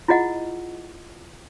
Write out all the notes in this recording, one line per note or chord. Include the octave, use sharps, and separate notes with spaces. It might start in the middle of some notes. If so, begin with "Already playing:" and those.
E4 F4 G#4 D#5 F#5